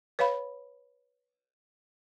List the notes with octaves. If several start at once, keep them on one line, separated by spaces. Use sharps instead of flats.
B4 C#5 F5 B5